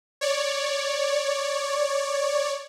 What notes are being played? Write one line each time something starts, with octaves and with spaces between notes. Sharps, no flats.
C#5 D5